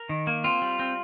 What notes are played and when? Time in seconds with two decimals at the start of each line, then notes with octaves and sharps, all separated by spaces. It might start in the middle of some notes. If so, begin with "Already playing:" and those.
Already playing: A#4
0.09 D#3
0.27 A#3
0.44 C4 F4
0.62 G3
0.79 C4